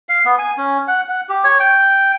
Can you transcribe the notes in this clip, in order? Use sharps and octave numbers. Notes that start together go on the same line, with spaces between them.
F5
B3
G#5
C#4
F#5
F#5
G4
C#5
G5